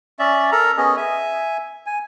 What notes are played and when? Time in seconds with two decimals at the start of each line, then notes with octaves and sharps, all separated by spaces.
0.19 C#4 D5 E5
0.52 A4 A#4 A#5
0.77 B3 C#4 G#4 D#5
0.97 E5 G#5
1.86 G#5